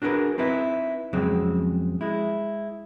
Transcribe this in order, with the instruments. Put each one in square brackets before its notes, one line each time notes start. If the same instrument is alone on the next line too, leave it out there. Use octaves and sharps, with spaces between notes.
[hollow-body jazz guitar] D4 F#4 G#4 A#4 B4
C4 D#4 E4 B4
F2 C#3 F#3 G#3 C4
G#3 E4